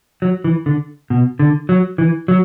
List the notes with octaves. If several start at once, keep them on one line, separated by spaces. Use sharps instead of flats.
F#3
E3
D3
B2
D3
F#3
E3
F#3